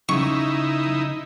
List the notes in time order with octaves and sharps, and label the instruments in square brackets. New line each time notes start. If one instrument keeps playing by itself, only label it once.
[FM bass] C#3 [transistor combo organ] D#4 E4 [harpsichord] C#6